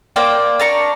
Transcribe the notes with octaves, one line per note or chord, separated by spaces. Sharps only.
A#3 C5 D5 G5
D4 A#5 C#6